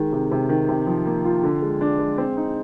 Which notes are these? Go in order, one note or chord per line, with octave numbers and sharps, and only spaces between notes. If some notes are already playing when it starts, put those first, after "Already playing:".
Already playing: D#3 G#3
C3
C3
D#3
C3
F3
A#3
F4
D3
G#3
D4
G#3
C4
D#4